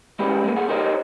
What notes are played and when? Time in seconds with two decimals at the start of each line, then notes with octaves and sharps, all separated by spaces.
0.19 G#3 B3 C#4 E4 G4
0.44 G#3 A#3 B3
0.56 C#2 A#2 G#4 F#5
0.69 D#4 G4 A#4 C5 C#5 D#5